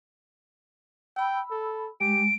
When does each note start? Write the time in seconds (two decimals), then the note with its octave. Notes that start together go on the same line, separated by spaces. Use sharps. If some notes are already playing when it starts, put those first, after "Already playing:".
1.16 G5 B5 E6
1.51 A4
2.01 G#3 G4 D7